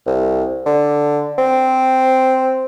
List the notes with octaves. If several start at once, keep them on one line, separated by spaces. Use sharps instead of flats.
C2
D3
C4